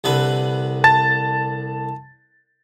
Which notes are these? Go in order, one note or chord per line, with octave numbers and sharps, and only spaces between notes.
C2 D3 B4
A5 A6